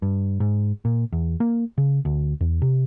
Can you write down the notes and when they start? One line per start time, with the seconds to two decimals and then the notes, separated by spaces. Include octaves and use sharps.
0.02 G2
0.40 G#2
0.85 A#2
1.12 E2
1.40 A#3
1.78 C#3
2.05 D2
2.41 E2
2.62 C3